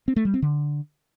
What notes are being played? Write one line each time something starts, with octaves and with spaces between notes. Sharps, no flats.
C4
A3
G3
C4
D3